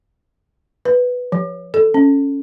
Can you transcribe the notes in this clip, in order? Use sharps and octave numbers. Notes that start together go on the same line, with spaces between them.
B4
F3
A4
C#4